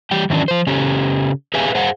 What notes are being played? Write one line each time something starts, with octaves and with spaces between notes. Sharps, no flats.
E3 G3 G4 G5
D#3 E3 F#3 C#4 D4
F3 C5
C#3 C#4 G4 A4
G4 G#4 B4 E5 F5 G#5
G#4 C5 F5 F#5